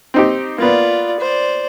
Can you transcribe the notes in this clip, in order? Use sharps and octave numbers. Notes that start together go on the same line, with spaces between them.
C4 D#4 G4
A#3 B3 F4 D5
C5 D5